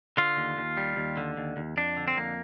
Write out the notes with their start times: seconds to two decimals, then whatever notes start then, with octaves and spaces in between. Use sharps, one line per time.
0.17 D3 F4
0.37 D#2
0.57 D#2
0.77 G3
0.97 D#2
1.17 D3
1.37 D#2
1.57 D#2
1.77 F2 D4
1.97 D3
2.08 C4
2.17 F2 A#3